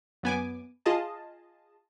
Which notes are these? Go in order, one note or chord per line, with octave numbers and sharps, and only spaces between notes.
F#2 B3 G#5 D6
F4 G#4 D#5 A5